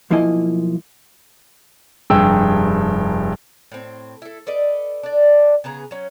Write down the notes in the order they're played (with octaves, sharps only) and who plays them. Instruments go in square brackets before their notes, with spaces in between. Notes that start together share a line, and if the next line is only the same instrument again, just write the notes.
[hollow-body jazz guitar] B1 F3 A#3 E4 D#5 G#5
[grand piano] F1 G2 G#4 G5 E6
[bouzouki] A2 C4
E4 A4
A4 B4 D5 D#5
D4 D5
C#3 B3 G#4 A#5
F#3 C#4